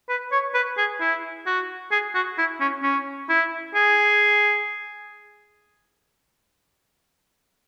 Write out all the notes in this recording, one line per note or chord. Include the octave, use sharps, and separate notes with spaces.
B4
C#5
B4
G#4
E4
F#4
G#4
F#4
E4
C#4
C#4
E4
G#4